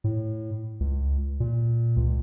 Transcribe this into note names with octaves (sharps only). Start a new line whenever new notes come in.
A2
C#2
A#2
C#2